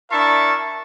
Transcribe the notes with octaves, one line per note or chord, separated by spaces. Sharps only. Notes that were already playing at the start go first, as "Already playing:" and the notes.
D4 E4 A#4 E5 A5 C#6